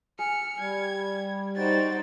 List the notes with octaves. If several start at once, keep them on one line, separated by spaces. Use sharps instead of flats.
G#4 F6 C#7
G3 G#6
D#4 F#4 C5 G5 A6